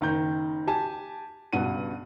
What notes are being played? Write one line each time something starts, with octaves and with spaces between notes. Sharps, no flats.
F#1 D#3 A#5 G6
G4 G#5 A5
C#2 G2 B2 F#5 D#7